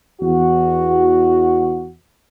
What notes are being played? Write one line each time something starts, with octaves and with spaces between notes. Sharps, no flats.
E2 F#4